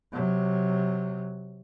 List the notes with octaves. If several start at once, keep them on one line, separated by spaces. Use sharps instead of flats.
C3 F#3